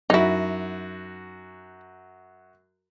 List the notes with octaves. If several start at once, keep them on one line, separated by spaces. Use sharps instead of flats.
F#2 D#4 E4 F#4